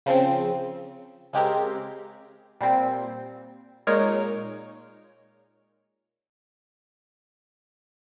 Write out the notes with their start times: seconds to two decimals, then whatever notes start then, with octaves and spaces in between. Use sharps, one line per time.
0.06 C#3 F3 C4
1.33 C#3 G#3 C4 G4 A#4
2.61 A#2 G3 C4
3.87 A#2 G#3 D#4 A#4 C#5